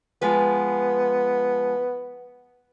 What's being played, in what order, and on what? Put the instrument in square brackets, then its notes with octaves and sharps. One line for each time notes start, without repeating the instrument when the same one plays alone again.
[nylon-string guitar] F3 G#3 B4 [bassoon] B3